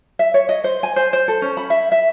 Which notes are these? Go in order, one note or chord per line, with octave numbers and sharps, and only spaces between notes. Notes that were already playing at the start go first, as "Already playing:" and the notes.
E5
C#5
D#5
C5
G#5
C5
C5
A4
C#4
B5
E5
E5